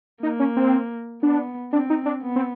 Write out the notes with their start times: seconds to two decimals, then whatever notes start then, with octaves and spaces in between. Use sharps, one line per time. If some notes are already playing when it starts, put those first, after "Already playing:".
0.22 A#3 D#4
0.40 C#4
0.57 C4
1.23 B3 D4
1.73 C4 D4
1.90 D#4
2.06 D4
2.23 B3
2.36 C4